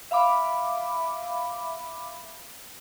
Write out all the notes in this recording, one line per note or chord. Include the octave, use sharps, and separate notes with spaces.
E5 F5 B5 D6